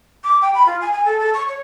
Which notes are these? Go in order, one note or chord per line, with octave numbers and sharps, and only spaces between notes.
D6
G5
B5
F4
G#5
G#5
A4
A4
C#6
C#5